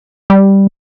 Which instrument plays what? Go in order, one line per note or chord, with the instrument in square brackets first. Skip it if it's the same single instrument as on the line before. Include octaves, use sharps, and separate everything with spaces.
[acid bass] G3